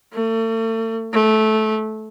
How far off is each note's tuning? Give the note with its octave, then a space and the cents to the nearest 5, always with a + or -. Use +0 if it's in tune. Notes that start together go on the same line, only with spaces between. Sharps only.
A3 +40
A3 -15